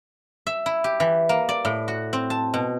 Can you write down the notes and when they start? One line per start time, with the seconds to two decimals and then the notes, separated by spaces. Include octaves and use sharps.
0.47 E5
0.66 E4
0.84 G4
1.00 E3
1.29 A#3
1.49 D5
1.65 A2
1.88 F#4
2.13 C4
2.30 A5
2.54 B2